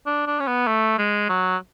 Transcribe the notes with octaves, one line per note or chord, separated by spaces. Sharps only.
D4
D4
C#4
B3
A3
G#3
F#3